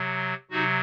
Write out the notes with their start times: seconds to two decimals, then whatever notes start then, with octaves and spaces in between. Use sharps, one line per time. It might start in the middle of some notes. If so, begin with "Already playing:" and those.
Already playing: C3 F#3
0.50 C3 F#3 D#4 F#4